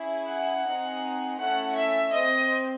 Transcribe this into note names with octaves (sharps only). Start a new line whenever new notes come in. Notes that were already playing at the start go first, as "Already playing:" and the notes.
Already playing: C#4 E4 G#4
F#5
C4 D#4 G#4
A3 C#4 E4 F#5
E5
C4 D#5